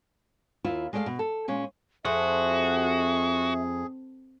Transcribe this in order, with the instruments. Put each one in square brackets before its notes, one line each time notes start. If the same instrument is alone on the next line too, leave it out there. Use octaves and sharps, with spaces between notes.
[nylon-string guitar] D#2 E4 F4
G#3 A3 D5 D#5 F5
B2
A4
A#2 G#3 C#4
[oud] F2 [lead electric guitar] F#4 [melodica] G#4 [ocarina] E5